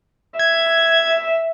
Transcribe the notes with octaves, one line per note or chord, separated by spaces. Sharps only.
E5 G#6